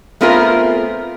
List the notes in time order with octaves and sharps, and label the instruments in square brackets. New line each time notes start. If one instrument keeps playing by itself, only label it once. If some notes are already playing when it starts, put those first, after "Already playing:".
[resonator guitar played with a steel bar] A3 B3 C4 F4 G#4 A#4